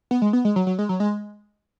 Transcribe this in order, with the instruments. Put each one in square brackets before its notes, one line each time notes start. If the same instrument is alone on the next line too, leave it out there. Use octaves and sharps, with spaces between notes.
[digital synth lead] B3
G#3
B3
G#3
F#3
F#3
G#3
F#3
G#3